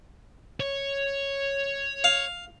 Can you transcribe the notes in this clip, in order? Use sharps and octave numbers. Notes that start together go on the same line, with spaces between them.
C#5
F5